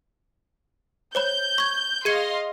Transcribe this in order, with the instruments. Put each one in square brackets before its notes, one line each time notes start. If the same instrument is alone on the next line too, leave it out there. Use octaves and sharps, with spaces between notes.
[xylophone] C5 C#5 B5 [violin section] G6
[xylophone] C#6 G#6
[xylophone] G#4 G#6 C#7 [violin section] D#5 F5 C6